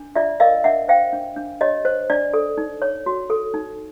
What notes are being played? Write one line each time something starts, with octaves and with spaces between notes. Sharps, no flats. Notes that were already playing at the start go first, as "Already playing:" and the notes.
Already playing: D4
F4 D5 E5
A#4 D#5 F5
D4 E5 F#5
C5 F5 G5
D4
D4
G4 C#5 D#5
C5
D4 D5
A4
D#4
C#5
F#4
A4
D#4